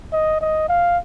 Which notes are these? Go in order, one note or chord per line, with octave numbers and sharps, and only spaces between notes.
D#5
D#5
F5